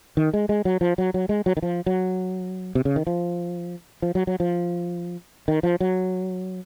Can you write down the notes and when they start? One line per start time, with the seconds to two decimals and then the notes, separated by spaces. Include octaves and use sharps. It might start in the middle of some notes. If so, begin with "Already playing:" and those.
0.17 D#3
0.34 G#3
0.49 G#3
0.65 F#3
0.81 F3
0.98 F#3
1.14 F#3
1.29 G#3
1.46 F#3
1.57 D#3
1.62 F3
1.86 F#3
2.75 C3
2.85 C#3
2.96 D#3
3.07 F3
4.02 F3
4.15 F#3
4.27 F#3
4.40 F3
5.48 D#3
5.63 F3
5.80 F#3